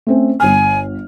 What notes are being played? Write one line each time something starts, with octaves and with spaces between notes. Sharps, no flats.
A3 C4 C#4
G1 G#5 F6